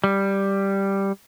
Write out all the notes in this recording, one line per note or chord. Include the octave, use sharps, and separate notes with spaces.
G3